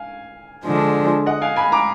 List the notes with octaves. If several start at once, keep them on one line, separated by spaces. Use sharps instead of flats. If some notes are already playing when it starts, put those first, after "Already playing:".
Already playing: F5 G#5
D3 F3 G#3 D4
D#5 F#5
F5 G#5
G#5 B5
A#5 D6